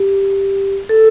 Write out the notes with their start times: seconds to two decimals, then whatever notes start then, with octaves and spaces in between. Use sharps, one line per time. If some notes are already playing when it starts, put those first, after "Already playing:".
Already playing: G4
0.89 A4